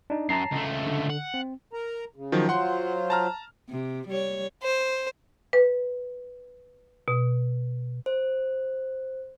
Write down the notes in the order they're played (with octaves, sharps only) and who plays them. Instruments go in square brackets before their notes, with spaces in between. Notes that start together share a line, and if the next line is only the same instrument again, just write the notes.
[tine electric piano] D4 D#4
[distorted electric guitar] F#2 [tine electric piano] A5 A#5 C7
[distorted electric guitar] C#2 A3
[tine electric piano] D3
[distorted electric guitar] F#5
[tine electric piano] C4
[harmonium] A#4 A#5
C#3
[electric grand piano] D#3 F3 F#3
[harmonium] F#3 F4 C5 [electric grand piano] F#5 C6
[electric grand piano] A5 A#5 F6
[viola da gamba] C3
G3 C#5
[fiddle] C5
[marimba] B4
B2
[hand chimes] C5